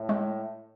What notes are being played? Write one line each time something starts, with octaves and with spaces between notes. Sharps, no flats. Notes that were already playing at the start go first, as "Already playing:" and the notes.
Already playing: A2
G#3